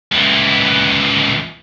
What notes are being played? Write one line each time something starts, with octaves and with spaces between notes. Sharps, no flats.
C#2 E3